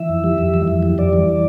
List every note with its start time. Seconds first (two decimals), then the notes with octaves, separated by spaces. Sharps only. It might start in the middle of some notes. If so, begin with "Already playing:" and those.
Already playing: E3 E5
0.09 F2
0.24 G3
0.38 F2
0.54 E3
0.68 F2
0.83 G3
0.98 F2 D5
1.13 E3